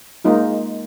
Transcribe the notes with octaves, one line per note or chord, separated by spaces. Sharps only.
G#3 A#3 D#4 F4